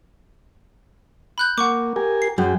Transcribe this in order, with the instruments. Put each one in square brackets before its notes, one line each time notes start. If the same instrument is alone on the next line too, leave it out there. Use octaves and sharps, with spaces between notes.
[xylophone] B5 F#6 G6
[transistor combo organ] A#3 [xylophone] F#5 C#6 D6
[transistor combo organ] G4 A#4 G#5
[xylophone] C7
[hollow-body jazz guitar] F#2 [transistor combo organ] F#4 G#4 G5